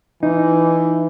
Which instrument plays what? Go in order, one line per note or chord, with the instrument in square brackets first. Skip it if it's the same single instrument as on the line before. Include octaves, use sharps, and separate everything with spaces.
[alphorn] E3 [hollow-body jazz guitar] D#4